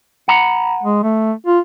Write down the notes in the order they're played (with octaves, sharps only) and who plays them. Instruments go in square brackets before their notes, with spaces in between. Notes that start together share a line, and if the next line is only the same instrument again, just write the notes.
[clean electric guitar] F#5 A#5 B5
[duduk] G#3
A3
F4